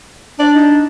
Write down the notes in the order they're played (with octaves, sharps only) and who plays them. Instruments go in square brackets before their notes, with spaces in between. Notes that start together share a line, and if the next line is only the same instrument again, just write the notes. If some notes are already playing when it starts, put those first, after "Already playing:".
[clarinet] D4 [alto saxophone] D5
[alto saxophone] D#4